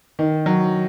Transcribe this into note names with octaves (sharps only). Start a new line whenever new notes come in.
D#3
F#3